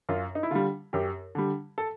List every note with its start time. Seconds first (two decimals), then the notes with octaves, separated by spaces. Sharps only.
0.09 F#2 F4
0.35 D#4
0.43 E4
0.51 D3 G3 F4
0.93 F#2 G4
1.35 D3 G3
1.78 A4